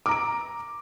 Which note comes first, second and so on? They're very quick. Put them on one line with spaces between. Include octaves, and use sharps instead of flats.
D6 A#5 D7